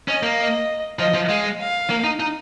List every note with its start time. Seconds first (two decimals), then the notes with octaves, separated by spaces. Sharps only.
0.08 C#4 D#5
0.23 A#3
0.39 D#5
0.99 F3 D#5
1.14 F3
1.29 G#3 F5
1.60 F5
1.90 A#3
2.04 D#4
2.20 D#4